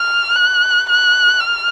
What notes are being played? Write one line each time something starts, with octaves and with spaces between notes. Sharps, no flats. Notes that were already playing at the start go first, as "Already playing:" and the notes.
Already playing: F6
F#6
F#6
F6